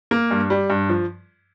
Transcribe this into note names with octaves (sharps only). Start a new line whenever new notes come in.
A#3
G2
G3
G2
F3